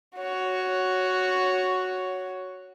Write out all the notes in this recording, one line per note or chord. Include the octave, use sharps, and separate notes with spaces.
F#4 C#5